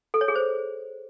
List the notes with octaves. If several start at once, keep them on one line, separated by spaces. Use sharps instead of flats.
A4
C#5
G#4
C5